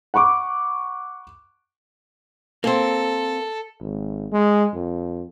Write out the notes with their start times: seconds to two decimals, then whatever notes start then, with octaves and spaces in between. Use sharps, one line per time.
0.14 F#5 B5 C#6 D6
2.64 A#3 C4 A4
3.81 G#1
4.32 G#3
4.73 F2